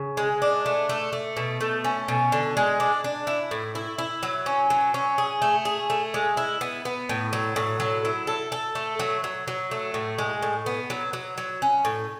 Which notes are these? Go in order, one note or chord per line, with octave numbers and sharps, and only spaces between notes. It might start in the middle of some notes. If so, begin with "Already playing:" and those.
Already playing: C#3
G#3
D4
A3
A3
A3
B2
A3
C#4
B2
D3
G#3
D4
D4
E4
A2
E4
E4
F#3
C#4
F#3
C#4
G#4
A3
G#4
A3
G#3
E4
B3
B3
A2
F#3
A2
F#3
E4
A4
A4
A3
F#3
F#3
F#3
A3
A2
G#3
A2
B3
F#3
F#3
F#3
C#4
A2